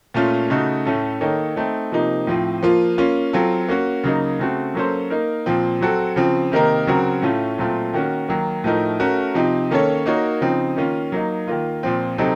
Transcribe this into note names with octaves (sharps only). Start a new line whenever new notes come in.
A#2 A3 C#4 F4
C#3 A3 D#4 F#4
A2 A3 C#4 A4
D#3 A#3 D#4 A4 C#5
A3 C4 D#4
C3 F3 A#3 D#4
A2 F3 C4
F3 A#3 F4
A#3 C#4 F4
F#3 C4 F4 A4
A#3 C#4 F#4
C#3 F#3 A#3 D#4
C#3 A3 C4 F#4
F#3 A#3 C#4 A4 C5
A#3 D#4 A#4
A#2 F3 C4
F#3 C4 F#4 A4
C#3 F3 C4
C3 D#3 A#3 D#4 A#4
C#3 F#3 C4 F#4 A#4
A2 A3 C#4 F4
A#2 F#3 A3 C4 F4
D#3 A#3 C#4 F#4
D#3 F#3 A#3
A2 F3 A3 D#4 A#4
A3 C#4 F#4 A#4
C3 F3 C4 D#4
D#3 A#3 C#4 A4 C#5
A#3 D#4 F#4 A#4 C#5
C#3 F3 C4 D#4
D#3 A#3 C#4 F4
F#3 A#3 D#4
D#3 A#3 F4
A#2 F3 C4
C3 F#3 C4 D#4 A4